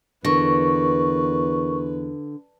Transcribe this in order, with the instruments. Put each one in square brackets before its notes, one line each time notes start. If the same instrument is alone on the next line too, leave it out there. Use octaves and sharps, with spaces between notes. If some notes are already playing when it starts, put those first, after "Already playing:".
[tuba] E2 [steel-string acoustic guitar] D3 [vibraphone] A#4 C#6 [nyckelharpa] B4